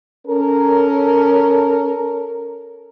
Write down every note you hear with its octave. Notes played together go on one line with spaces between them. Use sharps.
C#4 A4 A#4